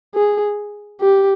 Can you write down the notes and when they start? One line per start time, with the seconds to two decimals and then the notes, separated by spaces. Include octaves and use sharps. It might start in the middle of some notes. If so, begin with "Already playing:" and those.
0.15 G#4
1.01 G4